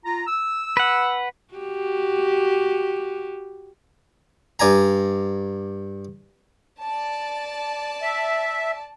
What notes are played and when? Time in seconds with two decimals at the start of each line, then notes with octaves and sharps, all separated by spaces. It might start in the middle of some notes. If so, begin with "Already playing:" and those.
0.05 F4 A#5
0.27 E6
0.77 B4 F#5
1.54 F#4 G4
4.59 G2 D5 G#5 A#5
6.80 D5 A5
8.02 E5